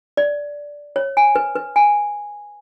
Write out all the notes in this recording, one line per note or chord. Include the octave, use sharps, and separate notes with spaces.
D5
C#5
G#5
B4
B4
G#5